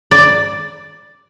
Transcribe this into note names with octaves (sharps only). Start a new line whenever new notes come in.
D5